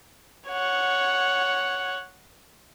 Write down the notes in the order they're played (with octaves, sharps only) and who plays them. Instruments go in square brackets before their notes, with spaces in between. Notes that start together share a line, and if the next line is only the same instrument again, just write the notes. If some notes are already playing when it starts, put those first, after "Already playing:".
[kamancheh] C#5 F#5